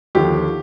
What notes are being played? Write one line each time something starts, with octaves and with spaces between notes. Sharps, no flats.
D#2 D3 F3 G4